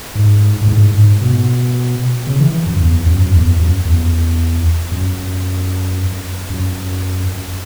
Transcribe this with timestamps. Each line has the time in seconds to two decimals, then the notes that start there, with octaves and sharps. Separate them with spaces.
0.15 G#2
0.61 A2
0.68 G#2
0.94 G#2
1.22 B2
2.27 C#3
2.40 E3
2.66 F#2
2.80 E2
3.06 F#2
3.22 F#2
3.33 E2
3.59 F#2
3.85 E2
4.92 F#2
6.50 F#2